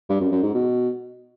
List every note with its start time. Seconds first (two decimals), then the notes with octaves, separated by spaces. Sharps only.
0.09 G2
0.20 F#2
0.32 F#2
0.43 G#2
0.54 B2